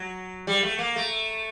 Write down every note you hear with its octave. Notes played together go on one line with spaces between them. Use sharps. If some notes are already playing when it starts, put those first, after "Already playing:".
Already playing: F#3
G3
A3
A#3
A3